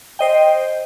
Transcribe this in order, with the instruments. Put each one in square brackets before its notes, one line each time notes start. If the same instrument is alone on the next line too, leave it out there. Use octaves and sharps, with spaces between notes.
[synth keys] C5 D#5 G5